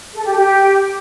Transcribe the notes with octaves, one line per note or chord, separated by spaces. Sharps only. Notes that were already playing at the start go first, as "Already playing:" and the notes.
A4
G4
G4